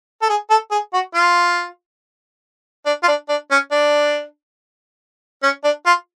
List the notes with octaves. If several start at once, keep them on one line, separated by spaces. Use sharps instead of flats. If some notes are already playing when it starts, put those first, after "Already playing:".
A4
G#4
A4
G#4
F#4
F4
D4
F4
D4
D4
C#4
D4
C#4
D4
F4